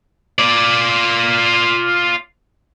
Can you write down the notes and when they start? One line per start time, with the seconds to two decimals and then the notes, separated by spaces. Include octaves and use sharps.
0.39 F4 D5